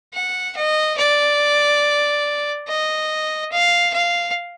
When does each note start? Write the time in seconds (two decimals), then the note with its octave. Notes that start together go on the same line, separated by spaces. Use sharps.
0.14 F#5
0.56 D#5
0.98 D5
2.68 D#5
3.52 F5
3.94 F5